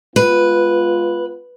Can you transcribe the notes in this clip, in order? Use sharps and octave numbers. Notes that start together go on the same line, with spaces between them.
G#3 B3 F4 B4